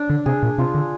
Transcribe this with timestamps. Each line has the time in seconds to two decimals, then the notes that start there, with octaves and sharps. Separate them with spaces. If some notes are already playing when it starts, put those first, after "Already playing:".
Already playing: D4
0.10 D3
0.26 C3 G#4
0.43 A#2
0.58 C3 F4
0.75 D3